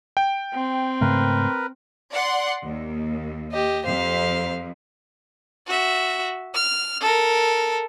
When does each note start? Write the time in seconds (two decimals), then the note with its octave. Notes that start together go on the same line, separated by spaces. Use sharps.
0.17 G5
0.54 C4
1.01 G#2 C#3 A3 A#4 B4
2.12 D5 F#5 C6
2.65 D#2
3.52 G4 D#5
3.85 F2 C5 F5
5.67 F#4 E5
6.54 F6
7.00 A4 A#4